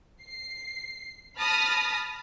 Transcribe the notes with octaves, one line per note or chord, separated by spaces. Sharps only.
C7
A5 B5 D#6 F6 A#6